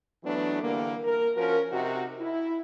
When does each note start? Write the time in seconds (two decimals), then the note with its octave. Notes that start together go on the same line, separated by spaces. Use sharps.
0.24 E3 F#3 A3 B3 D4
0.63 D3 E3 G3 A#3
1.04 A#4
1.37 F3 C#4 F#4 A#4
1.72 C3 D#4 F#4
2.21 E4